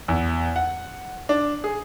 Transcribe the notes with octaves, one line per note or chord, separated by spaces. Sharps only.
E2
F#5
D4
G#4